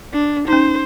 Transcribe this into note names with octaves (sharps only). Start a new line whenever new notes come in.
D4
C#4 D#4 C5